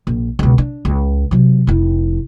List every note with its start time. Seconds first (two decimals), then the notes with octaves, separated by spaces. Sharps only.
0.07 A#1
0.39 C#2 B2
0.58 D4
0.85 C#2
1.31 C3 F#3
1.67 F1 E4